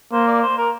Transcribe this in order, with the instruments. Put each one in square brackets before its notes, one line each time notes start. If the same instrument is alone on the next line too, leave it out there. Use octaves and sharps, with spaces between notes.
[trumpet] A#3 [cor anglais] C5
[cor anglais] D5
C5
A#4